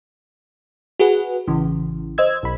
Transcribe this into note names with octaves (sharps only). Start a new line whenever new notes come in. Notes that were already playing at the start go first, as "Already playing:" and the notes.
F#4 G#4 B4 F#5
A1 C#3 E3
C5 D#5 E6 G#6
B1 B5